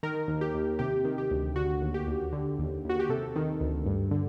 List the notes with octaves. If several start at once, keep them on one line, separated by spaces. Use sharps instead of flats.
D#3 A#4
D#2
G4
D#2
C3 G4
D#3
G4
D2
D3 F#4
D#2
G4
D#2
D3
D#2
D#2
F#4
G4
C3 A4
D#3
D2
G2
D3